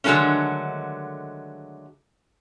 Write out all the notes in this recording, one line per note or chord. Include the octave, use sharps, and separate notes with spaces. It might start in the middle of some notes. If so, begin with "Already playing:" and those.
D3 D#3 F#3 G#3 A3 C#4